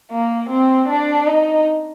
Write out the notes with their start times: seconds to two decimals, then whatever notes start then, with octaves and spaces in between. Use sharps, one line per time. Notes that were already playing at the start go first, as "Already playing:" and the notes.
0.11 A#3
0.50 C4
0.89 D4
1.27 D#4